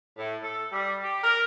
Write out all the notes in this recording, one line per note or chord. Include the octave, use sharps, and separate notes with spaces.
A2
A4
G3
G4
A#4